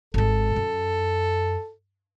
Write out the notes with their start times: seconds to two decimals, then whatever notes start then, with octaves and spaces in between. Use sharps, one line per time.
0.14 G#1 G#3 A4
0.56 F#2